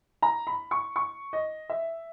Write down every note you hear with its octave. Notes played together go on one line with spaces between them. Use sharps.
A#5
B5
C#6
C#6
D#5
E5